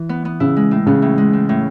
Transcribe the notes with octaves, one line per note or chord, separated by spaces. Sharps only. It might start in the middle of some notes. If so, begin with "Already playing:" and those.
Already playing: E3
B3
B3
C#3 E4
G#3
A2
C#3 B3
A2
G#3
A2
A2